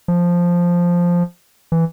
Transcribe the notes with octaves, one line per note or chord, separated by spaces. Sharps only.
F3
E3